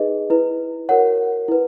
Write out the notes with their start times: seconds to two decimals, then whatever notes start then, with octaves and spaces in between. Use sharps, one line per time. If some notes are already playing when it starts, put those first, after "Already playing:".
Already playing: D#4 G#4 B4 D#5
0.30 E4 B4
0.89 F#4 A#4 C#5 F#5
1.48 E4 B4